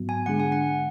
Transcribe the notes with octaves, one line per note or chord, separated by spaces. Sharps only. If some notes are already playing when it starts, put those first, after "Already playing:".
Already playing: G#2 F#3 B3 F#4
G#5
D3 G#3 D4 G#4 F#5
G#5
F#5